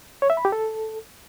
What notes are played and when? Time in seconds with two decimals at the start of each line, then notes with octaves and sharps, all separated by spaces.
0.22 C#5
0.30 E5
0.37 B5
0.45 G4
0.52 A4